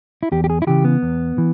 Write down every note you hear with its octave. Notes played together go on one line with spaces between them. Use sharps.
E4
E2 G4
G4
G#4
E4
C#3 E3 G4
B3
E2
E3